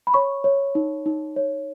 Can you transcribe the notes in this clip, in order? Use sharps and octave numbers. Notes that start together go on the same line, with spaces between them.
B5
C#5 C#6
C#5
D#4
D#4
C#5